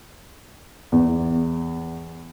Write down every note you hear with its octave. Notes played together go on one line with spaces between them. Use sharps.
E2